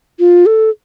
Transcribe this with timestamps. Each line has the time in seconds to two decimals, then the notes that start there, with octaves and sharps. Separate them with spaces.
0.19 F4
0.46 A4